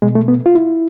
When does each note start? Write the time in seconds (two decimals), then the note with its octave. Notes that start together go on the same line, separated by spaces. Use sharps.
0.02 B2 G#3
0.15 A3
0.28 B3
0.46 F4
0.55 E4